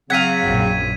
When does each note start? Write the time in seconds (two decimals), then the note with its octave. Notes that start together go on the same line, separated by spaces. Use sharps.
0.10 C#3 F#3 C4 F5 F#5 G#6 B6 D#7
0.42 A#1 F#2